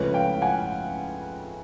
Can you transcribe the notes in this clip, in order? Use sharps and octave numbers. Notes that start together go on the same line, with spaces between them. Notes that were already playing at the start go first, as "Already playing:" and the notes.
Already playing: C#2 C#3 F3 A3 B4 C#5
F5 G5
F#5 G#5